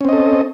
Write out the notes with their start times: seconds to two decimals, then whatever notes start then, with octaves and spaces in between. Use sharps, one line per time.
0.01 C#4
0.05 C4
0.09 D#5
0.13 A4